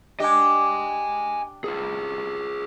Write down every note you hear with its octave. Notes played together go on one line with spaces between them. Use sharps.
D4 G4 D#5 G#5
F4 G#4